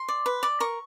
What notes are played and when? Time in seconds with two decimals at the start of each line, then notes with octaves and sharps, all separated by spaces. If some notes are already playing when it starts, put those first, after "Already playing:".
Already playing: C6
0.08 D5
0.26 B4
0.43 D5
0.60 A#4 C#6